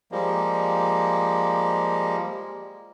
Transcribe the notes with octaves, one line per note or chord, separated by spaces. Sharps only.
F3 G3 G#3 A#3